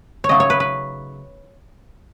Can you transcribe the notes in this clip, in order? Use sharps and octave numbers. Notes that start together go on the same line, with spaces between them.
C#5
C#3 F#3 A3 D#4 D#5
C#5
B4
B4